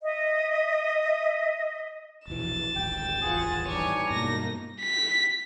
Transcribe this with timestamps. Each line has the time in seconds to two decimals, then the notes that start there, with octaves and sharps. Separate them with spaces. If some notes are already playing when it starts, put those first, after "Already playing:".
0.02 D#5 E5
2.28 E1 A#1 E3 A6 E7
2.76 D1 G#1 G#2 G5
3.22 D1 G#1 E2 F4 G#4 B4 F#5
3.68 E3 G3 D4 D#4 C#5 G#5
4.10 G2 B2 G#3 A#3 D#4 A#6
4.81 B6